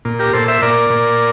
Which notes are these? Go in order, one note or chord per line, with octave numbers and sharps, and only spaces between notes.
A#2
G4 A#4
A#2 A4 C5
C5 E5
A#2 A#4 D5
A#2